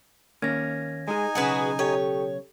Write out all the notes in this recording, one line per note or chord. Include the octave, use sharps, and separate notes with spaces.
D#2 A#3 C#4 G#6 A#6
G#3 D#4 G#4 G#5
B1 C#3 F#4 G#4 B4
G4 A4 C#5 G5